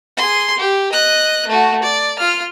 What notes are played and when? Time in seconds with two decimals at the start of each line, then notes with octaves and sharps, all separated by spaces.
0.17 G#4 C6
0.58 G4
0.92 D#5 F#6
1.48 A3 F#4
1.83 D5
2.19 F4 F6